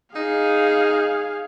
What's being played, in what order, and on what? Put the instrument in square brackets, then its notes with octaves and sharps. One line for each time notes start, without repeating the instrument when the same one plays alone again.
[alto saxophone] D#4 [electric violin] G#4 F5